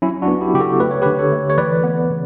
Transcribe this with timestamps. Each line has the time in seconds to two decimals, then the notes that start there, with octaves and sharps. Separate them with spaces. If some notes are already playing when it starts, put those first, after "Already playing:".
0.02 F#3 C#4 E4
0.22 D4 F#4
0.28 B3
0.41 E4 G4
0.54 C#3 G4
0.60 F#4 A4
0.80 A3 B4
0.91 C#5
1.02 G4 B4
1.06 D3
1.19 A4 C#5
1.32 A3
1.50 C#5
1.58 E3 B4 D5
1.84 B3
2.10 C#3